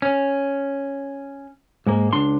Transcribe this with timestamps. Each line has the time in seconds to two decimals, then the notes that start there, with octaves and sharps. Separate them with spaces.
0.02 C#4
1.86 G#2 G#3 A#3
2.13 C#2 D4 C6